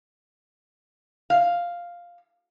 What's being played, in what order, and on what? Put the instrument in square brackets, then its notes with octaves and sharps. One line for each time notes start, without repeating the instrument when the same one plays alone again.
[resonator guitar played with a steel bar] F5